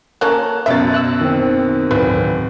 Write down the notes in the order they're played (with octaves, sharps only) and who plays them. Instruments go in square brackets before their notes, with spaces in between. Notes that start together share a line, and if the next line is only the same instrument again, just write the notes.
[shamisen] A#3 C#4 A4 [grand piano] A5 A#5 F#6
[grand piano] F#2 B2 A6 [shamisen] E5
[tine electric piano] E6 F#6
D#3 C4
[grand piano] D1 [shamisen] B4